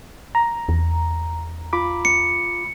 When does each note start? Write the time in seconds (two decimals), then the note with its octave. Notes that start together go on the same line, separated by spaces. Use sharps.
0.35 A#5
0.69 E2
1.73 F4 B5 D6
2.05 C#7